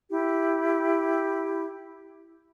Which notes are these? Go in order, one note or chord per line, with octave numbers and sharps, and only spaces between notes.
E4 G4